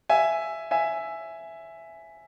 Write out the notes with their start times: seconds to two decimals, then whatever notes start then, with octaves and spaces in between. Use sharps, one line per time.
0.09 E5 G#5
0.71 E5 G#5